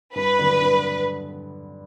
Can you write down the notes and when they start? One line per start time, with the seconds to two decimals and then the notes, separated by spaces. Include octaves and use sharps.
0.15 G2 B4
0.39 D3 F#3 B3
0.62 G2